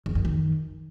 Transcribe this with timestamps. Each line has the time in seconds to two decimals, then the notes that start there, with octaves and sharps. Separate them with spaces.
0.06 E2
0.15 F#2
0.25 D#3